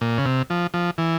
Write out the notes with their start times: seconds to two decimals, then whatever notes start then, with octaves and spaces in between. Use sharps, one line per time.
0.01 A#2
0.18 C#3
0.25 C3
0.50 F3
0.74 F3
0.98 E3